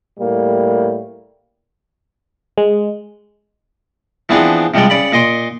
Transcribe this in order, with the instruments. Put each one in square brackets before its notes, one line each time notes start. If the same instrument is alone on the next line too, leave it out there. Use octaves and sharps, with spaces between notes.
[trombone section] A2 G3 A#3
[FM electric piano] G#3
[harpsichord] E3 F3 B3 C4 D4 G#4
C3 F3 G3 G#3 D5
C#3 D5 B5
A#2 D#5 C6 D6